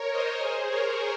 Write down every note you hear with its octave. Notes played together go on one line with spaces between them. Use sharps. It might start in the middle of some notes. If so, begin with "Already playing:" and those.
Already playing: A#4 C#5
C5 D#5
G#4 C5
A#4 C#5